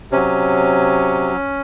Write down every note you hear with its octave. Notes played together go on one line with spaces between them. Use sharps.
C3 F#3 C#4